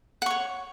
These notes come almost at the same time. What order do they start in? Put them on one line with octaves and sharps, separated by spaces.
F#5 C#6 C#5